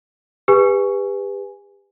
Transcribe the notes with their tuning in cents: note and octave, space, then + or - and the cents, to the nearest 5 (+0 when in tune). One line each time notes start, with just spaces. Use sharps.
G4 +35 B4 +0 G#5 +0